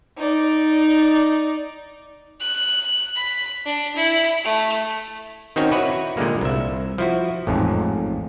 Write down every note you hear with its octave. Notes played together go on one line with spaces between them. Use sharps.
D#4 D5
F#6
B5
D4
E4
A3
D#3 C4 C#4 D#4 F#4 C#5
E4 F#4 B4 C#5 D5
A#2 D3 G3 G#3 A#3
C2 E5
F3 E4 F#4
A1 F2 G#2